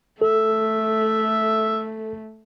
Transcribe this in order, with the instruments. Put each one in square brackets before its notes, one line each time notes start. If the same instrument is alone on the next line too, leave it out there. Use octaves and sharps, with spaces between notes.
[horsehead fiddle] A3 [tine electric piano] A4 [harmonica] E5